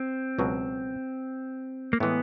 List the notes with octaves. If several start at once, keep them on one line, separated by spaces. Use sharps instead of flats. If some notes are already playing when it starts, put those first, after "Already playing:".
Already playing: C4
C#2 B2 F#3
A#3
A2 E3 G#3 B3